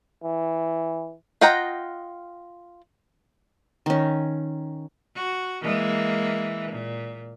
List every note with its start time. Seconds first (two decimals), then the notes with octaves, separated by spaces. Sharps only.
0.23 E3
1.41 F4 D#5 F#5 G5 A#5
3.86 D#3 C#4
5.15 F#4
5.62 E3 G#3 A#3
6.71 A#2